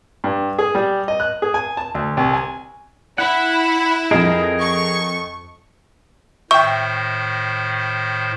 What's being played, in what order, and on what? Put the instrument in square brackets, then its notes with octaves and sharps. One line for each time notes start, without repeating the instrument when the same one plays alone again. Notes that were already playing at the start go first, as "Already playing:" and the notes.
[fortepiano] G2
G#4
G3
D#5
F#6
G#4
G#5
A5
D2
C2
G#5
[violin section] E4 [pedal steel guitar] F#5
[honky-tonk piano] F2 D#5 [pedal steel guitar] G#4 A#4
[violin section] C#6
[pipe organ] A2 D#3 C5 [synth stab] E5 G5 [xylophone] C#6